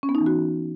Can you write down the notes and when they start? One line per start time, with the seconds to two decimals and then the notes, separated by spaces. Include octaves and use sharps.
0.03 C#4
0.09 B3
0.15 D#4
0.21 E3
0.26 F#4